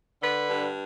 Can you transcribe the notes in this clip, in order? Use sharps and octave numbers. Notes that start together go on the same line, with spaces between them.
D3 B4
G2